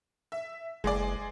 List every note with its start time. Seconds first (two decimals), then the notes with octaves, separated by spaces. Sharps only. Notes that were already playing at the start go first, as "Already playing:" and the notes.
0.32 E5
0.84 F#1 G#3 G#4 D5